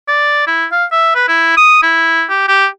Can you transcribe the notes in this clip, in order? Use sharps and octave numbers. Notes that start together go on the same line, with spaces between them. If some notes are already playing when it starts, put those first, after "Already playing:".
D5
E4
F5
E5
B4
E4
D#6
E4
G4
G4